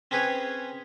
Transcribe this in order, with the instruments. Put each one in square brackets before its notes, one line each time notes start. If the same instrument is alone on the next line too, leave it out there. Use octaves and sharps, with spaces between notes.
[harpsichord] C4 C#4 G#4 B4 C#5